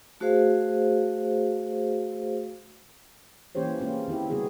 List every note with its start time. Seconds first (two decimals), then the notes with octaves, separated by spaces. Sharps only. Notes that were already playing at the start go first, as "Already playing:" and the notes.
0.20 A3 F#4 G#4 C5 F5
3.55 E3 A#3 C#4 G4 C5 C#5
3.80 G#3 A#3 C4 C#4 F4
4.08 D#3 C4 E4 G4
4.30 C#3 G3 B3 F#4 G#4